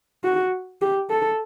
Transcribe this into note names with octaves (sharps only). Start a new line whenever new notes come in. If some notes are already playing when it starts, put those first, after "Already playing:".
F#4
G4
A4